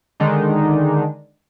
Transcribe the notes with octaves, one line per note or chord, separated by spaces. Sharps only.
D3 D#3 G#3 D4 D#4